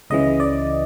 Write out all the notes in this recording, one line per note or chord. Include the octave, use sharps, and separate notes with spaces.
C#2 C#3 E3 D#5
D5